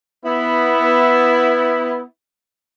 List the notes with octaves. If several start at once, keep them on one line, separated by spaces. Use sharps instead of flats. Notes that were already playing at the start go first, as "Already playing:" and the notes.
B3 E4